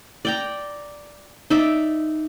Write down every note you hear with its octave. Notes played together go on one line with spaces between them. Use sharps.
D5 G5 A#5
D#4 D5 E5 D6